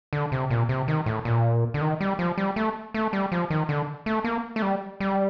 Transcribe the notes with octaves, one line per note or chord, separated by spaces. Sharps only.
D3
C3
A#2
C3
D#3
A2
A#2
D3
D#3
G3
F3
G3
A3
A3
G3
F3
D#3
D3
A3
A#3
A3
G3
G3